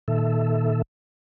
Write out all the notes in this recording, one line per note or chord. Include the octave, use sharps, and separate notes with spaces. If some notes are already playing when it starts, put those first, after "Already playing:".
A#2 D#3 A4 E5